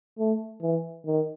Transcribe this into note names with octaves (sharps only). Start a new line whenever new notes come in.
A3
E3
D#3